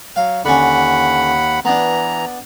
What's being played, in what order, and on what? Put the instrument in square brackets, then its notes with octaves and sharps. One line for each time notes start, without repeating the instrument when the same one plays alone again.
[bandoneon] F#3 [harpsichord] F5
[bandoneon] D#2 F#5 B5 [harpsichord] D3 C#4
[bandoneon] E3 A#5 [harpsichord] B3 D4